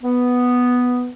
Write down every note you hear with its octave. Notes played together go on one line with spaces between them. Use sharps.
B3